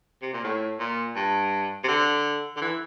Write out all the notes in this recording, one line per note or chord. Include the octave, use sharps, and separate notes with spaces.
C3
A#2
A2
A#2
G2
C3
D3
D3
E3